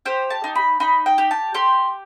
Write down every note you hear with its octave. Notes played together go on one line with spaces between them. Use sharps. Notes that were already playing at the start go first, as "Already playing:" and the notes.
G4 C5
A5
D#4
B5
D#4 B5
G5
G4
A5
G4 C6